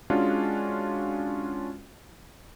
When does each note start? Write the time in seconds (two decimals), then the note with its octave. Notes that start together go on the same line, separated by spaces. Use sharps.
0.10 G#3 C#4 D4 F4 F#4